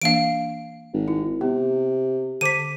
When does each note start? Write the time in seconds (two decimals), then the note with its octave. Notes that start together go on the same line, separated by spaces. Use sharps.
0.02 E3 A#3 D4 F5 D7
0.93 G#1
1.08 E4
1.41 C3 B3
2.41 D3 C5 D6 B6 D#7